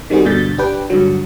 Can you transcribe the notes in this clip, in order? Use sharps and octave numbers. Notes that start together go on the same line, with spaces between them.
D#3 G3 C4 F#4 G#4
G2 B2 D3 G6 A6 B6
D4 G4 B4 G5
G2 D3 F#3